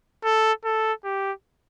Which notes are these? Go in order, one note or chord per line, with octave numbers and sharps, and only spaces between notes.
A4
A4
G4